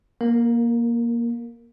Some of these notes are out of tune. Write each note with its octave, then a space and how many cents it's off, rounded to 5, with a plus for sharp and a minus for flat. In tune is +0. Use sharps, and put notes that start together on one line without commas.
A#3 +15 A#4 -15